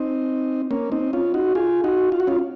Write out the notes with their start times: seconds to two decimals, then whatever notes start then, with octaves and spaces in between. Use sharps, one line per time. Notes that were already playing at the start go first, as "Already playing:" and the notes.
Already playing: C4 D#4
0.71 A#3 C#4
0.92 C4 D#4
1.13 C#4 F4
1.34 D#4 F#4
1.55 F4 G#4
1.84 D#4 F#4
2.12 F4
2.20 F#4
2.27 C#4 F4